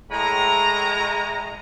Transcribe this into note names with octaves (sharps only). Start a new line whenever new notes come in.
A2 G#3 A#5